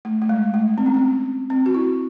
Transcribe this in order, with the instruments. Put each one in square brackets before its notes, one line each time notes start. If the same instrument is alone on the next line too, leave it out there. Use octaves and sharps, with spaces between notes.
[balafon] A3
A3
G#3
A3
C4
C#4
C4
C4
F#4
E4